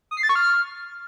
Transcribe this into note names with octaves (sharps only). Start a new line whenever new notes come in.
D#6
C7
A6
C#6
F6